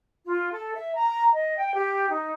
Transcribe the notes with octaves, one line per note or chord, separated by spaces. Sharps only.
F4
A4
E5
A#5
D#5
G5
G4
D#4